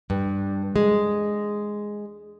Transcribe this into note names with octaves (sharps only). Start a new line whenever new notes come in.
G2
G#3